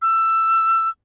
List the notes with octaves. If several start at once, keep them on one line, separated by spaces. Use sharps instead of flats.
E6